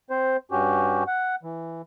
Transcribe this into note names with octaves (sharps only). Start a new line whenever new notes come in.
C4 C5
G2 C#4 F#4 G4
F#5
E3